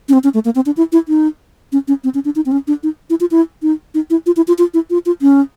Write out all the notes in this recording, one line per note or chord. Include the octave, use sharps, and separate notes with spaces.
C#4
C4
C#4
A3
A#3
C4
D4
E4
E4
D#4
C#4
C#4
C4
C#4
D4
D#4
C4
C#4
D4
D#4
E4
F4
E4
D#4
D#4
E4
F4
E4
F4
F4
E4
F4
F4
C#4